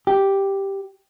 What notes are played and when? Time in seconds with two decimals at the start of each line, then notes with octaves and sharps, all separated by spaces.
0.07 G4